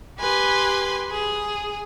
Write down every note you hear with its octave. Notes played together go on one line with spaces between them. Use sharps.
G4 B4 G#5 C6
G#4